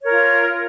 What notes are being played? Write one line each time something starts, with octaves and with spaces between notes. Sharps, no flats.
F4 A#4 C#5